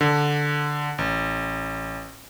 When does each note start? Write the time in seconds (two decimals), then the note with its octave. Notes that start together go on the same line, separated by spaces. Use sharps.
0.01 D3
0.98 A1